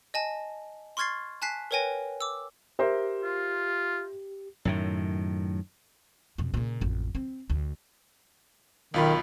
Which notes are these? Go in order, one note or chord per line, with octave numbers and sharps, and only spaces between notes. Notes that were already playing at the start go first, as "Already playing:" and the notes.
D#5 G#5 A5
C6 C#6 F6 G#6 A6 C7
G#5 A5 F#6 B6 C7
A#4 B4 C#5 G5 G#5 A#6
D6 E6
G4 A#4 C5 E5
F4
F#2 A2 D#3
F2 B2
A#2 C#3
A1 F2
C4
D2
B1 D#3 F4 B5